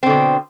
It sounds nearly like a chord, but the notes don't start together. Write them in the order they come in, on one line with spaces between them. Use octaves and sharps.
C4 D3 B2